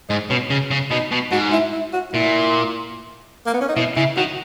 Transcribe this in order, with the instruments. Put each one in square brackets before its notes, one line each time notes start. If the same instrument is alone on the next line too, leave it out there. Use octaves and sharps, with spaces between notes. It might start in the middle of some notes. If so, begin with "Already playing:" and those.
[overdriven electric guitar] G#2 [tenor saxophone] D#4
[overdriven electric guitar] B2 [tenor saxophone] C#4
[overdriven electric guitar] C#3 [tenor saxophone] C#4
[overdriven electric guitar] C#3
[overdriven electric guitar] B2 [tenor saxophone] D#4
[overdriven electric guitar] B2
[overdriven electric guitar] G#2 [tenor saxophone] F#4
[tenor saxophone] E4
E4
F#4
[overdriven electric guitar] A#2 [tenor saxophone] E4
[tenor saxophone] A#3
B3
C#4
D#4
[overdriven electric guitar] B2 [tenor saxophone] E4
[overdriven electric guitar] C#3 [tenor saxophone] E4
[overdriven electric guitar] D#3 [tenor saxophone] F#4